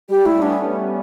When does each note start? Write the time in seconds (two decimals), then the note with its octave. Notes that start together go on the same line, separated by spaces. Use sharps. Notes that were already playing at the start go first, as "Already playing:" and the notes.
0.09 G3 G4
0.25 A3 E4
0.36 C#4
0.41 B3 D4